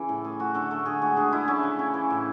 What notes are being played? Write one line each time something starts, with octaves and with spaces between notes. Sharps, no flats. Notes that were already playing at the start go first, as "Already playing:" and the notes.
Already playing: C#3 E3
A2
A3 G#4
A3 F#4
D3 A4
A3 A4
D3 G#4
G#3 F#4
D3 G#4
D3 E4
A3 C#4
C#3
C#3
E3
A2